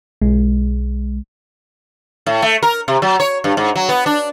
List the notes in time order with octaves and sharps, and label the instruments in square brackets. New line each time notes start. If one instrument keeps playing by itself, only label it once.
[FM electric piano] B1 G#3
[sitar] A2
A3
A#4
C3
F#3
C#5
G2
G#2
F#3
B3
D4